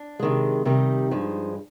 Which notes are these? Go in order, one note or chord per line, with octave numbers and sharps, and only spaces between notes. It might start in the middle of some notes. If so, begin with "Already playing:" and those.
Already playing: D4
C3 D#3 G#3
C3 D#3 G3 D#4
G2 F3 G#3